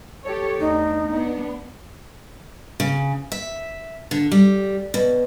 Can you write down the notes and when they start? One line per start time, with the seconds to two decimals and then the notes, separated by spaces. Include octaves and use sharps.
0.23 G4 A4 C#5
0.60 E2 A3 D4 D#4
1.11 B3 D4
2.80 C#3
3.32 E5
4.11 D3
4.32 G3
4.94 B2